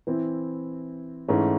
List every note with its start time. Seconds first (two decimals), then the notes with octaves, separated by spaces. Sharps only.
0.07 E3 C4 E4
1.28 G#2 E3 A3 C#4